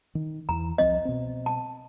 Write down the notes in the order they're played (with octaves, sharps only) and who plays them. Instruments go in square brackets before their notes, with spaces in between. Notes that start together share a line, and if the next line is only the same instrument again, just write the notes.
[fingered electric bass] D#3
[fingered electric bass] E2 E3 [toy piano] A#5
[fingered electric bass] C2 F3 C4 [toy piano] D#5
[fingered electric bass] B2 C4
[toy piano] A5